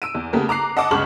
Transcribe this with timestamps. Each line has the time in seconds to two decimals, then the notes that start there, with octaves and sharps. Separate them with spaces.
0.02 E6 D7 D#7
0.15 E2
0.33 C#3 A3 B3 G4 A#4
0.49 A#5 D6 F#6 C7
0.77 D#5 F#5 A5 D6
0.91 G1 C#2 C#3 C#6 F6 F#7